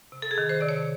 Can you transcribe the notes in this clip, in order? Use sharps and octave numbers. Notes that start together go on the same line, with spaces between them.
C3
A4
G#4
D#3
C5
C3 D5
C#5